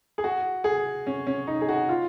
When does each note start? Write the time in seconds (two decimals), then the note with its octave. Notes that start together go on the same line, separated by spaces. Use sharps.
0.18 G#4
0.24 F#4
0.64 G#4
1.07 C#4
1.27 C#4
1.47 D#4
1.61 G#4
1.69 F#4
1.89 F4